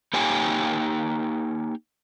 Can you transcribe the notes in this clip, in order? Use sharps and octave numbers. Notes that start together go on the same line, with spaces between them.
A#3 D#4 G4 C#5 G5 G#5